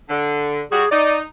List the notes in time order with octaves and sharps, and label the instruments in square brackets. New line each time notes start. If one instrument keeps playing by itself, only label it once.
[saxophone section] D3
[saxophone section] G3 F#4 [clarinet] G#4
[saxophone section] D#4 [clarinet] D5